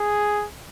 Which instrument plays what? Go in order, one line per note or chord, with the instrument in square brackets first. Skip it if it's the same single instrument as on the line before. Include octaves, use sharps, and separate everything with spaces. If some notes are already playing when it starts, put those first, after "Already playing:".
Already playing: [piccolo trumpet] G#4